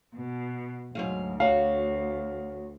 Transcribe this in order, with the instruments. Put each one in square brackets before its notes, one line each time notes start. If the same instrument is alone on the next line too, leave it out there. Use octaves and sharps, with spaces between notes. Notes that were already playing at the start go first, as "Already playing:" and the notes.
[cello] B2
[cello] D2 [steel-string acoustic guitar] G#2 F#3 F5
[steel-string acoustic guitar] F#4 C#5 [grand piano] F5